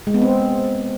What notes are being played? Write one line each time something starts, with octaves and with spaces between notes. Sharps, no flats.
G#3
B3
C4